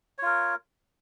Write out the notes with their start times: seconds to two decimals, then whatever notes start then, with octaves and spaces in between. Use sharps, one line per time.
0.18 C#5
0.22 F4
0.26 A#4